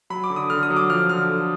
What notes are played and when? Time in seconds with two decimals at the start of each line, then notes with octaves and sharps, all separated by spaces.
0.10 F#3 B5
0.24 D6
0.30 D3
0.36 D#6
0.50 D3 F6
0.63 D#6
0.70 F#3
0.76 D6
0.89 F3 F6
1.10 D3 F6
1.30 D3